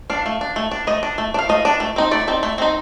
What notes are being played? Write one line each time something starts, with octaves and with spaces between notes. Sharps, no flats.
D4 F5
A3
D4
A3
D4
A3 D#5
D4
A3
D4
F5
A3 D#5
D4
A3
C4 D#4
A3 D5
C4 D#4
A3
C4 D#4